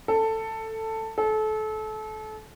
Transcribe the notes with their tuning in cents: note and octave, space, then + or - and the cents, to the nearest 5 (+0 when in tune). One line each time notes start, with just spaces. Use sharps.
A4 +10
A4 -30